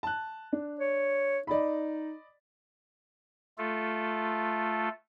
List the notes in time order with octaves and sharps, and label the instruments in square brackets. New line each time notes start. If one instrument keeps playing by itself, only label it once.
[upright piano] A5 F#6
D4
[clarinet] C#5
[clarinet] D#4 [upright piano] D5 D#5 B5
[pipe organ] A3 F4 A4